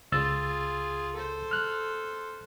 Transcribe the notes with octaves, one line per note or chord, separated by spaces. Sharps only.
C#2 F4 G#4 E6 A6
A4 C5
F6 F#6